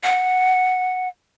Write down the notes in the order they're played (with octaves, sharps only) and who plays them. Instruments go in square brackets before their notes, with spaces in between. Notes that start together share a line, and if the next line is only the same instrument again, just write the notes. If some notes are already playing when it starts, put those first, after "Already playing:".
[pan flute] F#5